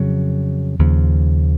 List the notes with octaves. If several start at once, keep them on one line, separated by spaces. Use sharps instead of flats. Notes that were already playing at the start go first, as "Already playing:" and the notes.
Already playing: F2 C#3 F#3
D#2 C#3 F3